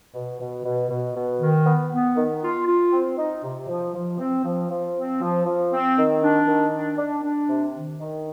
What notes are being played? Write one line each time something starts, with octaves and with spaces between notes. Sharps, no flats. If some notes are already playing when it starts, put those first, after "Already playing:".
B2
B2
B2
B2
B2
D#3
B3
B3
D#3
F4
F4
C4
D#4
C3
F3
F3
C4
F3
F3
C4
F3
F3
C4
D#3
D4
D#3
D4
D4
D4
C3
D#3
D#3